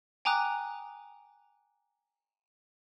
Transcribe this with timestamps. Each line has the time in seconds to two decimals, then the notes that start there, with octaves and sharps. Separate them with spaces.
0.25 G5 G#5 A#5 D6 D#6 F#6